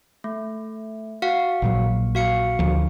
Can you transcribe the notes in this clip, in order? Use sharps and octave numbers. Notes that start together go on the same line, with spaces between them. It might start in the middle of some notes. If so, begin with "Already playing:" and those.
A3
F#4 F5 F#5
A#1 A#2 F#3
F#4 F5 C#7
D2 F3